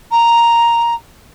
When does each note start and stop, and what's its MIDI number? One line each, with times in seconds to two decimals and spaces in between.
0.11 0.94 82